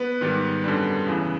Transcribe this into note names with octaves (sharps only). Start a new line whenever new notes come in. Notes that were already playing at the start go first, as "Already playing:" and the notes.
Already playing: B3 B4
G#2 D#3 G3
F#2 D3 G3
E2 C#3 E3